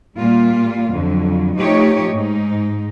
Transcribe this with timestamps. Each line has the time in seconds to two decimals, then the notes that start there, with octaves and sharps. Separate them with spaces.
0.17 A#2 G3 A#3 F4
0.93 F2 D3 F#3
1.58 F3 A3 D#4 G4 C#5
2.12 G#2 D#4